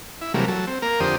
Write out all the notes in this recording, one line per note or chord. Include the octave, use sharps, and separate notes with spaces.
E4
C3 E3 F#3 G3 A3 A#3
F#3 A4
C4
A#3 A#4
F2 D3 G4 C5 D#6